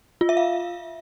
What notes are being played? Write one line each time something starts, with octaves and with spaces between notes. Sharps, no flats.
F4
E5
F5